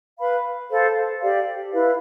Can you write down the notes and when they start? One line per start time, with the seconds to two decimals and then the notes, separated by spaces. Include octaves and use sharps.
0.18 B4 F5 B5
0.70 A4 C5 F5
1.20 G4 D5 F5
1.72 E4 B4 F5